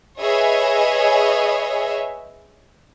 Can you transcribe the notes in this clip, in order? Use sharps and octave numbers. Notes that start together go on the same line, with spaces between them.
G#4 B4 C#5 D#5 E5 G#5